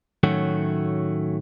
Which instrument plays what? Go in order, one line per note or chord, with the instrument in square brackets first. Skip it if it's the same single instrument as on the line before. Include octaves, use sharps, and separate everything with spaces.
[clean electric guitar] A2 D#3 F#3 A3 C#4 F#4